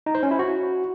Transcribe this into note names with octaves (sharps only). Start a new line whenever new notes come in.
D#4
C5
C#4
E4
F#4